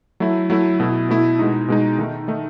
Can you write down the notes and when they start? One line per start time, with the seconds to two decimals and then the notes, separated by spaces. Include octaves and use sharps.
0.20 F#3 A3 E4
0.50 F#3 A3 E4
0.80 B2 A3 E4
1.09 B2 A3 E4
1.39 B2 G#3 D#4
1.68 B2 G#3 D#4
1.98 D#3 A3 D#4
2.28 D#3 A3 D#4